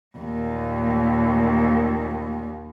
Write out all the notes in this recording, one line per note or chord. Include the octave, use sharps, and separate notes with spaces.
D#2 A#2